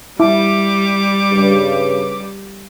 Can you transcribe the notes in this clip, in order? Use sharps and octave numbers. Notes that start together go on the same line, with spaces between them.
G3 E4 D6
G2 C#3